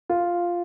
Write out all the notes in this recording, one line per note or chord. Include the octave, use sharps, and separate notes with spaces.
F4